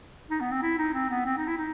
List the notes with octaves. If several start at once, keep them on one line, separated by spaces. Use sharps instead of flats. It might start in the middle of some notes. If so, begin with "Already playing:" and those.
D#4
B3
C4
E4
D#4
C4
B3
C4
D#4
E4
D#4